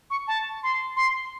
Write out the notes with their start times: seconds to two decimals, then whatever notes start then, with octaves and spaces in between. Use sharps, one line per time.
0.10 C#6
0.28 A5
0.63 C6
0.96 C6